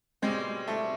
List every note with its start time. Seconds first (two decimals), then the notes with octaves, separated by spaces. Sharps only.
0.22 B2 G3 G#3 C4
0.68 A3